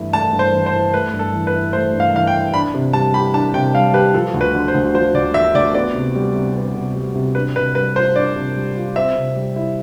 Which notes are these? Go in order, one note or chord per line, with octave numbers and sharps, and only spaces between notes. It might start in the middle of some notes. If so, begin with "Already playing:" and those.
Already playing: G2 E3 A3 E4
A3 A5
G2
C5
E3
C5
E4
A3 B4
G2
A4
E3
B4
E4
A3 C5
G2
F5
E3 F5
G5
E4
D4 B5
C3
G3 A5
G4 B5
D4 A5
C3 G5
G3 F5
G4 B4
F3 A4
D2
B4
D3
C5
D2
F3 C5
D2 D5
D3 E5
D2 D5
B3 D5
C3
G3
C3
B3
C3
G3
C3
D4 B4
C3 B4
G3 B4
F4 C5
D4 D5
C3
G3
F4
C4 E5
C3
G3
E4